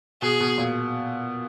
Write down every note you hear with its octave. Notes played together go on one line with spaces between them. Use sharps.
B2 G#4
B2
A#2